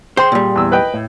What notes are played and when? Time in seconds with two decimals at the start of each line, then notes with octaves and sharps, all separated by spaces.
0.17 G#4 C5 G5 C6
0.32 A#2 G3
0.56 E2 E6
0.72 B4 D#5 G5
0.94 A2